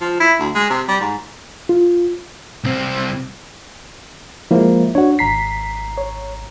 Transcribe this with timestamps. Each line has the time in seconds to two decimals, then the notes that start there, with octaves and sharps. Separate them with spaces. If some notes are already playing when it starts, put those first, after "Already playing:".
0.01 F3
0.20 E4
0.40 D2
0.55 G#3
0.70 C3
0.88 G3
1.00 G#2
1.69 F4
2.64 C2 C4
4.51 F3 G#3 A#3 E4
4.95 D4 F#4 C#5
5.19 G#1 A#5 B6 C7
5.98 C#5